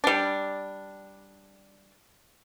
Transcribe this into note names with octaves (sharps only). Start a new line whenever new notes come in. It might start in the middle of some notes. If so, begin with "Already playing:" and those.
G3 D4